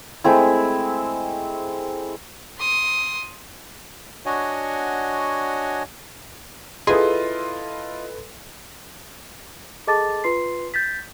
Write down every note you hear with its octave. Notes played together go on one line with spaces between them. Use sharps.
G#3 A3 C4 E4
C6 D#6
D4 F#4 C#5 D#5 F#5 G#5
E4 F4 G#4 A4 B4 D#5 C6
G#4 A4 D#5 A5 D6 A6
F4 B4 C6 C7
G6 A6 B6